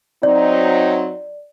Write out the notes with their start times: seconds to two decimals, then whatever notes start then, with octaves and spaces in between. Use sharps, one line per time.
0.23 F#3 C4 D#4 D5